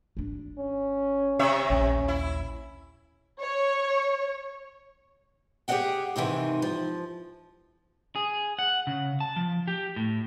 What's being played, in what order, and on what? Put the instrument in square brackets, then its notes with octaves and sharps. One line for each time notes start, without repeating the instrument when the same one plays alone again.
[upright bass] G#1 D4
[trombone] C#4
[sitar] C3 C#5 E5
[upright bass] A#1 D#2 [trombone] C#4
[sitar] E4
[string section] C#5
[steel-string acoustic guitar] G4 G#4 A#4 D#5 F#5 G5
G#2 C3 D#3 E3
F3
[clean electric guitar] G#4
F#5
C#3
A5
F3
G4
A2